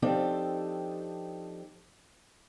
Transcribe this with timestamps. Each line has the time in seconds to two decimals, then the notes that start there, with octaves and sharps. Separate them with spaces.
0.02 F3 C4 D4 D#4 G4 A4